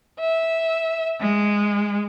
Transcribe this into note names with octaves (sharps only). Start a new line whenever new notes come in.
E5
G#3